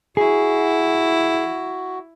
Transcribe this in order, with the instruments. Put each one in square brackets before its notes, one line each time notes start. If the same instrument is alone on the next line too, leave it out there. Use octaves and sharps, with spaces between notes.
[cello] E4 [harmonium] F#4 [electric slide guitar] G#4